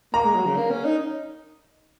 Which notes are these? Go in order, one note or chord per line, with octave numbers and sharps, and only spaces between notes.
A#3 A#5
G#3
F#3
C#3
A#3
C#4
D#4